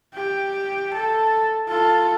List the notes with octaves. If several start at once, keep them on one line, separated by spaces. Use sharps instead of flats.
G4
A4
F4 A4